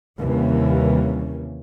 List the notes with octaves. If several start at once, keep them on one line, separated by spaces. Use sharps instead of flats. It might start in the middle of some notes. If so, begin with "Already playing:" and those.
D#2 C3 E3 G3 A#3 C#4